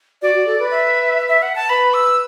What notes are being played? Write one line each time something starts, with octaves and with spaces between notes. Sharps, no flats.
F#4 D5
F#4
A4
B4
E5
E5
F#5
A5
B4 B5
E6